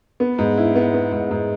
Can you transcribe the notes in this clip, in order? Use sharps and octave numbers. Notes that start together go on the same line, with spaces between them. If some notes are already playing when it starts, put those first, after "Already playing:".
B3
G#2
E4
B3
B3
G#2
G#2